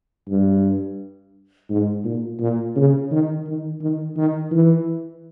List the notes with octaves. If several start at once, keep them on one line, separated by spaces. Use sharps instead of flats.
G2
G#2
A#2
A#2
C#3
D#3
D#3
D#3
D#3
E3